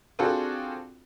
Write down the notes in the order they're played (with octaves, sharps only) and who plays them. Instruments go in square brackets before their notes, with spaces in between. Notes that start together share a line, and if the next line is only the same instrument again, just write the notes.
[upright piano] C4 D4 F4 F#4 G#4 A4